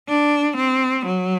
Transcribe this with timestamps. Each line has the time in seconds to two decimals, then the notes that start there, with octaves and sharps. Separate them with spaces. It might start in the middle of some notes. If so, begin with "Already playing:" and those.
0.08 D4
0.57 C4
1.06 F#3